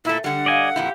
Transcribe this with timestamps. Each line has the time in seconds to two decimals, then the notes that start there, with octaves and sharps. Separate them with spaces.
0.05 A#2 A3 E4
0.24 D3 G3 F#5
0.46 D5 D#5 F5 G#5 E6 D7
0.76 F2 A#2 E4 G4